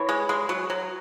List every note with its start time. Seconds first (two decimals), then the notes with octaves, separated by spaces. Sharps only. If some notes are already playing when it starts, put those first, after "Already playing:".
Already playing: E3 C#5
0.09 G#3
0.29 G#3
0.49 F#3
0.70 F#3